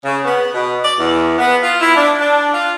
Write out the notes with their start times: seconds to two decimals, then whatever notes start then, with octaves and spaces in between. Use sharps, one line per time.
0.04 C#3
0.24 B3
0.53 B2
0.84 D5
0.98 E2
1.38 B3
1.62 F4
1.81 E4
1.94 D4
2.21 D4
2.53 F4